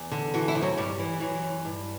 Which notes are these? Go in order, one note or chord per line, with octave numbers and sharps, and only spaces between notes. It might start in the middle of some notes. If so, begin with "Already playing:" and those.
Already playing: E2
D3
E3 F#4
E4
D2
F#3
G2 G3
E3
E3 F#3
F#2
G2